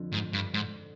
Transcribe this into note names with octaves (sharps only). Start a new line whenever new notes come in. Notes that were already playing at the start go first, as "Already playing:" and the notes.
Already playing: F2 D3 F3
G#2
G2
G#2